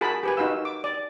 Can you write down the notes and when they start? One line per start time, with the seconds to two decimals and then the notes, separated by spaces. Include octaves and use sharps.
0.01 F#4 G#4 A#4 A5 B5
0.23 G4 B4 G#5
0.37 D#4 F#4 B4 F5 E6
0.65 D6
0.84 D5